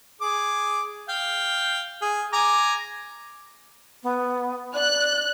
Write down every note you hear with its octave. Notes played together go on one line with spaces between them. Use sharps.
G#4 D6
F5 G5
G#4
G#5 A#5 D6
B3
D5 F#6